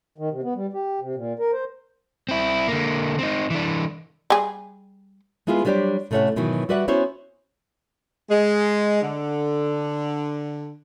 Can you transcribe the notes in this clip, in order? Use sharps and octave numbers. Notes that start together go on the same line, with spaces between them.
D#3
C3
B3
G3
G4
C3
A#2
A#4
C5
C4 E4
D3 A#3
C4 D#4
E3 D4
G3 G#4
G#3 B3 E4 F4 G#4 B4
F#3 G3 D4 G4 C5 D5
A2 C3 A3 C#4 C#5 F#5
G#2 B2 D#3 E3 F#3
G3 F#4 B4 D5 E5 F#5
B3 C#4 E4 F#4 C5 C#5
G#3
D3